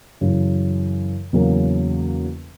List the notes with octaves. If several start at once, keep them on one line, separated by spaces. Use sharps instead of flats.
F#2 C#3 E3
E2 C#3 F#3 A#3 C#4